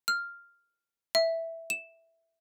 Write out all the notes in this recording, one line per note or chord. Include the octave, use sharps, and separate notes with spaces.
F6
E5
E7